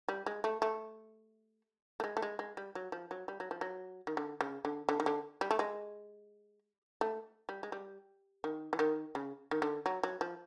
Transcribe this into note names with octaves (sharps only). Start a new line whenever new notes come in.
G3
G#3
A3
A3
A3
G#3
A3
G#3
G#3
G3
F#3
F3
F#3
G3
F#3
F3
F#3
D#3
D3
C#3
D3
D3
D#3
D3
G3
A3
G#3
A3
G3
G#3
G3
D#3
E3
D#3
C#3
D#3
D3
F#3
F#3
F3